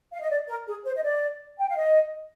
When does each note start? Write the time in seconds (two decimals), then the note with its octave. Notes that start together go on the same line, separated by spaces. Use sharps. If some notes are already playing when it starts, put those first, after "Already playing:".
0.12 F5
0.21 D#5
0.30 D5
0.48 A#4
0.67 G#4
0.85 C5
0.96 D#5
1.03 D5
1.58 G5
1.68 F5
1.77 D#5